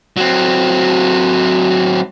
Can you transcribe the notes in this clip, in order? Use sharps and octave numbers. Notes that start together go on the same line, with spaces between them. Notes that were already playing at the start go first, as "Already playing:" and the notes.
F#3 C4